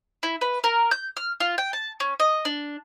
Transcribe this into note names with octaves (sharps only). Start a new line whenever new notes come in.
E4
B4
A#4
G6
F6
F4
G5
A5
C#4
D#5
D4